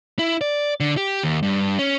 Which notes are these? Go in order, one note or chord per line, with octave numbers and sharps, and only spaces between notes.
E4
D5
D3
G4
D#2
G2
C#4